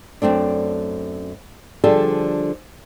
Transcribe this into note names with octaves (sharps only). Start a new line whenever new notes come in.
F#2 A3 C4 D4
D3 F3 G3 D4 G#4 A4